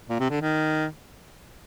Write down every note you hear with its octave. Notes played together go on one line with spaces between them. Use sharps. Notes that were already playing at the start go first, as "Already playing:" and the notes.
A#2
C3
D3
D#3